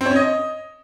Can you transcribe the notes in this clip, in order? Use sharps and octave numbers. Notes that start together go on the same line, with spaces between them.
C4
C#5
C#4
D#5